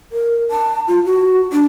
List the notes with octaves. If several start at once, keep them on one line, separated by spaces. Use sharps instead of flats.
A#4
A5
F4
F#4
D4